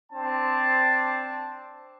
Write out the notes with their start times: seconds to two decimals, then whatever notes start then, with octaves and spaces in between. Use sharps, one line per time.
0.12 C4 D4 A5